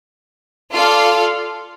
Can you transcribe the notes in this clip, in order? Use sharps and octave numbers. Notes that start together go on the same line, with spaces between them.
F4 A4 D5 F5